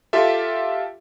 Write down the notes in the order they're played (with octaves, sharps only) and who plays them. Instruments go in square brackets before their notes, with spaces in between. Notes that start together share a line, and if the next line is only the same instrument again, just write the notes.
[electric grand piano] F4 G4 A4 E5